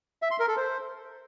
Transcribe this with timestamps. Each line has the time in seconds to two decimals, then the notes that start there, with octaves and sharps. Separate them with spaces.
0.22 E5
0.31 C6
0.40 A#4
0.48 A4
0.57 C5